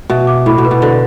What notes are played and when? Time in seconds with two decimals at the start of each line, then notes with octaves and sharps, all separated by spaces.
0.10 B2 E5
0.27 D6
0.46 A2 B5
0.58 B2
0.65 B4
0.71 B2
0.82 D3 C5